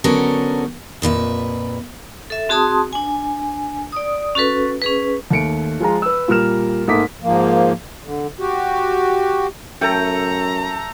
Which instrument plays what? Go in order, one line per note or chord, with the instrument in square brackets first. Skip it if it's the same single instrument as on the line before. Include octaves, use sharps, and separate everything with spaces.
[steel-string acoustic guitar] D3 F#3 B3 C#4 A4 A#4
F2 A#2 B4 E5
[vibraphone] A4 E5
C4 F#4 G#4 A5 C6 D#6
D4 G#5
D5 D#6
C#4 F#4 A4 B4
C#4 G#4 B4
[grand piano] D#2 A3 C#7 D7
F3 G#3 F4 A#5
B4 E6
A#2 G3 A#4 F6 E7
G#2 A3 A#3 D6 D#6 B6
[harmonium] G#2 F3 A#3
D3
F#4 G4
[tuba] F#2 [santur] A3 A4 G5 [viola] A#5